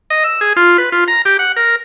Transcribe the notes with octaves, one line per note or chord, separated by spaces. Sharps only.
D#5
E6
G#4
F4
B4
F4
A#5
G4
F#5
A#4